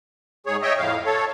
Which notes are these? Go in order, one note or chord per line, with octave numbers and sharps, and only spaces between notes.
G#2 G#4 C#5
C#5 D#5 E5 G5
F2 A2 F5
A4 C#5